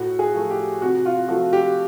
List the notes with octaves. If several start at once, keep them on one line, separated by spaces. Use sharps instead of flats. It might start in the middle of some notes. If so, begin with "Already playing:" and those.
Already playing: A2 F#4
G#4
F3 A3
G4
C3 F#4
F4
F3 A3 F#4
G4